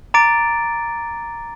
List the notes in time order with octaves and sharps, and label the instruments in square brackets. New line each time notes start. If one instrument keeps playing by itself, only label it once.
[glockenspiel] A#5 D6 A6 D7